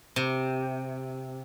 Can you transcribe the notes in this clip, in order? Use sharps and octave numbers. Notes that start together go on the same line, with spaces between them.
C3